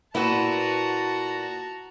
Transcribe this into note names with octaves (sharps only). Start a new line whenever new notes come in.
A#2 B3 E4 F#4 A5 A#5